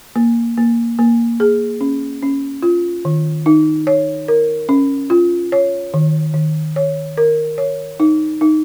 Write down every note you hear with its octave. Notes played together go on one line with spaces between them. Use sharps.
A#3
A#3
A#3
G#4
C#4
C#4
F4
D#3
D#4
C#5
A#4
C#4
F4
C#5
D#3
D#3
C#5
A#4
C#5
D#4
D#4